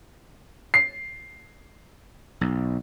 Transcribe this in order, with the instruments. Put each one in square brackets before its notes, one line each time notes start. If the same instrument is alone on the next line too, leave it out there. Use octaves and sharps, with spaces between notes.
[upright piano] C7
[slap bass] B1